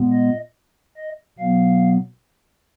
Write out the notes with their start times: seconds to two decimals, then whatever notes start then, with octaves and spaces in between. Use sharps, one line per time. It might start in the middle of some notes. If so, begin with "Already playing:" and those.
Already playing: A#2 G#3 B3
0.13 D#5
0.97 D#5
1.39 B2 F#3 B3 F5